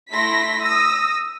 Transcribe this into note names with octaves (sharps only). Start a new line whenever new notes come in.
A3 E4 C6 A#6 B6
D#6 E6 A#6